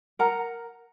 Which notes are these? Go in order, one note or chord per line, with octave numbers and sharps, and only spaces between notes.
A#4 F#5 A#5